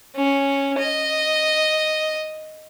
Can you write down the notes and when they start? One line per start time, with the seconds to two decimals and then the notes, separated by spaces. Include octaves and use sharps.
0.16 C#4
0.78 D#5